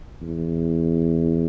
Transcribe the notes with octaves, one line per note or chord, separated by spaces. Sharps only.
E2